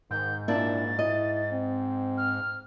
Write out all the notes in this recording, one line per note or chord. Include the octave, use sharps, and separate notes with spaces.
G#2 D#3 G6
A#2 D4 E4 A6
E4 D#5
C4
F6